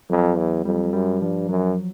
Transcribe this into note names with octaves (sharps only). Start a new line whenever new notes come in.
F2 F#3
E2
F2 G3
F#2 G3
G2 F3
F#2 F#3